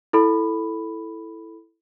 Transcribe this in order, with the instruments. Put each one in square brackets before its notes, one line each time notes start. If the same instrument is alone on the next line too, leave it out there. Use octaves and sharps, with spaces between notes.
[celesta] E4 A4 B5